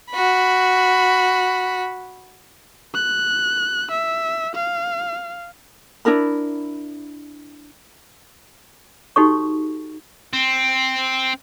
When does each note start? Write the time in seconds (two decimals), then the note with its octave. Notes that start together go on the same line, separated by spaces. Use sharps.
0.10 F#4 B5
2.95 F#6
3.91 E5
4.55 F5
6.05 D4 E4 A#4 B5
9.16 D#4 F#4 G4 A4 C#5 C#6
10.33 C4